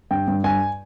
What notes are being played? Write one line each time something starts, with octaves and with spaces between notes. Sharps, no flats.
G2 G5
G2
G2 G#5